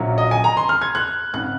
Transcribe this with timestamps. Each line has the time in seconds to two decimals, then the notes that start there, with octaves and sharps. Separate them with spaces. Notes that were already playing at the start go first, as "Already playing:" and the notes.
Already playing: A#1 A#2 F#3 A#3 C#4
0.18 D#5
0.31 G#5
0.44 A#5
0.57 C6
0.69 F6
0.82 G#6
0.95 F#6
1.33 G#1 C#3 F#6